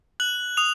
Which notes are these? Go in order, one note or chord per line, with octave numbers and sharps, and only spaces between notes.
F#6 F#7
D#6 F7